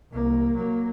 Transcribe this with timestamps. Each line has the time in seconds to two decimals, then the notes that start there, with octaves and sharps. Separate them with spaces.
0.11 C2 A#3
0.55 F#3 A#3